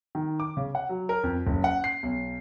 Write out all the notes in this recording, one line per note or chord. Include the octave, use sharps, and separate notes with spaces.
D#3
D6
C#3
F#5
F#3
A#4
F2
F#1
F#5
C7
B1